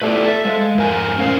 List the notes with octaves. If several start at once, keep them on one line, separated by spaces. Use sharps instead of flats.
A3 E4 F4 G4 B4 D5
A4 E5
G#3 C5 F5
F2 G#2 A#4 G#5
D2 A#2 C#4 A#4 C5 F5